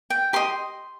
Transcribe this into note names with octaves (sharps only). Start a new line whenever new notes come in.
G5
G4 D#5 C6